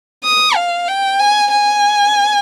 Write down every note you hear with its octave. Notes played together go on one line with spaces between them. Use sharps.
D#6
F5
G5
G#5
G#5